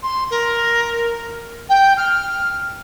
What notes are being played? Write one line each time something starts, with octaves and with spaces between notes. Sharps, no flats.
C6
A#4
G5
F6